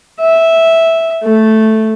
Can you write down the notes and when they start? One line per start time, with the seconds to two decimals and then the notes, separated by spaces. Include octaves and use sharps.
0.20 E5
1.23 A3 A4